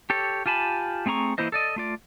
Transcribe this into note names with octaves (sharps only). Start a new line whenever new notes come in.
G4 A4 C#5
F4 G4 G#5 A5 B5
A3 C4 G#4 A#5 C#6
E3 A#3 E4 C5 D#5
A4 D5 D#5
A3 F4 D5